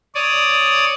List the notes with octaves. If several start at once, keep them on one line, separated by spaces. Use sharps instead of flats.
C#5 D5 D#6